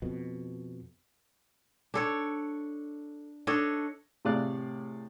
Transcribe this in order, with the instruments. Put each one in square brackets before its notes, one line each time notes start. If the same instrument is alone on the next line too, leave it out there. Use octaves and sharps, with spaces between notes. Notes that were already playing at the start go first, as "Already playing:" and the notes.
[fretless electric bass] F2 B2
[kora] D4 A4 C#5
D4 A4 C#5 D#5
[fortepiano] A2 C3 G#4 D5 F5 F#6